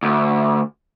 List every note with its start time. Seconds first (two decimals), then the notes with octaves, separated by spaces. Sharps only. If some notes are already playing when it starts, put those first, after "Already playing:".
0.03 D2